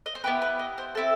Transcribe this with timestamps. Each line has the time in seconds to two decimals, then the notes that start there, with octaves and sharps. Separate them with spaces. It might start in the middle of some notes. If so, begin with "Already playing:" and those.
0.06 D#5
0.15 C5
0.24 B3 E4 G4 B4
0.42 B4
0.59 D#5
0.78 C5
0.95 C4 E4 A4